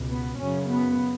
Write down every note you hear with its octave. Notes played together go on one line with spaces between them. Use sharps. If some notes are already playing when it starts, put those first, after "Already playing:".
Already playing: C#2 B2
B3
F#2 C#3 C#4
B3